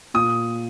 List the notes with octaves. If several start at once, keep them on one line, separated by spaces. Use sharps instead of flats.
A#2 D#6